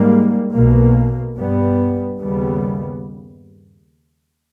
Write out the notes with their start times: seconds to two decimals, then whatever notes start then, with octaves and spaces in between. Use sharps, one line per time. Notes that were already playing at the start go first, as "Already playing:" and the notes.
Already playing: G#2 G3 A#3
0.52 B1 B2 A#3
1.35 G2 G3 B3
2.19 D#2 C#3 G3 B3